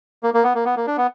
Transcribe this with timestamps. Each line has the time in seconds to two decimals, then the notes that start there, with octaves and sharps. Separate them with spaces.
0.23 A#3
0.34 A#3
0.44 B3
0.55 A#3
0.65 B3
0.77 A#3
0.87 D4
0.97 B3